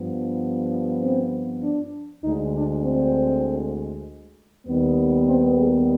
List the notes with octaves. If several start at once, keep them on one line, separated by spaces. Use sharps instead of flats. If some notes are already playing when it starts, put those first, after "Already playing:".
Already playing: G2 F3 B3
C4
D4
D2 D3 G#3 D#4
D4
C4
D#2 D#3 G3 B3
C4
G#4